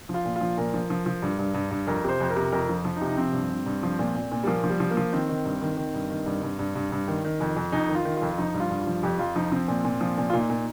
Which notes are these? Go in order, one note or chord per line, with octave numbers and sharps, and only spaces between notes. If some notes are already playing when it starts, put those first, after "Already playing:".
F3
F4
A#2
F4
F3
A#2 A#4
F3
F3
F3
G2
G2
G2
G2
F2 A#4
C3 C5
F2
A#4
C3
F2 A#4
F3
F3
D#4
C3
D#4
F3 C4
G2
G2
G2
F3
A#2
A#2
A#2
G3
F3 A#3
F3
G3
F3
A#3
F3
D#3 C4
D#3
G2
D#3
D#3
G2
D#3
G2
G2
G2
G2
G2
D#3
D#3
F2
F2
F2 D#4
D#3
F4
D#3
F2 F4
F3 D#4
G2
F4
G2
F4
F3
F2 G4
F2 F4
F3 D#4
F3 C4
A#2
A#2
F3
A#2
F4
A#2 D#4
A#2